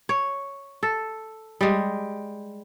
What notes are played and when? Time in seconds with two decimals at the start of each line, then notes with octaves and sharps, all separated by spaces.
0.09 C#5
0.83 A4
1.61 G3 G#3